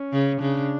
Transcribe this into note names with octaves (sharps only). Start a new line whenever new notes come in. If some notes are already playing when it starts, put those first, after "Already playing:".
Already playing: C#4
C#3
C#3 D4